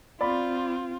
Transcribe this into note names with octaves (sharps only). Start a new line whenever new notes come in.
C4 F4 D5 B5